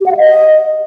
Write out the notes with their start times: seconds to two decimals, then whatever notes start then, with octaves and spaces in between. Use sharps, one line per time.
0.01 G4
0.06 F#5
0.11 F5
0.17 D#5